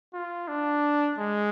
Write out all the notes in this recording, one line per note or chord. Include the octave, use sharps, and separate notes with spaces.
F4
D4
G#3